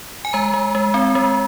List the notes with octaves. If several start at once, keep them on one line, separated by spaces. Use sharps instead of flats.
G#5
G#3 A#5
G#3
G#3
C4
G#3